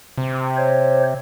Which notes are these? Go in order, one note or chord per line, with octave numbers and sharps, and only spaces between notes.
C3
C5 C#5